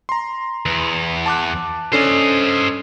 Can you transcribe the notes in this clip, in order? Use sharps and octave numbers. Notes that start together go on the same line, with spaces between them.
A#5 C6
E2
A5 D6 F#6
C#4 D4 A4 C5 D#5